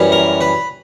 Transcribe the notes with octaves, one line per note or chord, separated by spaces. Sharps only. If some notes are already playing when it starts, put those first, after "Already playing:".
Already playing: F#2 E3 G3 C#4
A#4
B4